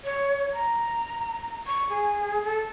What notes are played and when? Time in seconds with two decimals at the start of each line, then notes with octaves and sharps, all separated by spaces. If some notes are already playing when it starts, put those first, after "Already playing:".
0.04 C#5
0.53 A#5
1.66 C#6
1.89 G#4
2.44 A4